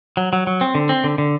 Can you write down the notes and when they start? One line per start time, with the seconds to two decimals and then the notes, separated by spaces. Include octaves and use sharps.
0.17 F#3
0.33 F#3
0.47 F#3
0.61 C4
0.75 D3
0.89 C4
1.04 D3
1.18 D3